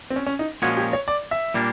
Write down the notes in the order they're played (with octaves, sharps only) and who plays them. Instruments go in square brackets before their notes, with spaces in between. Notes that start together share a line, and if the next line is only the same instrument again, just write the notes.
[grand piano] C4
C#4
C#4
D#4
[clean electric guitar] A#2 F3 G#3 C#4 [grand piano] F#4
[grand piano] G4
C#5
D5
E5
[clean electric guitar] A#2 G3 A#3 D4